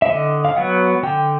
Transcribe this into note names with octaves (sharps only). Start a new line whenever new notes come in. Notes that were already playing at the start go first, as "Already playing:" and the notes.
E5
D3 D#5
F5
F#3 B3 F#5
D3 G5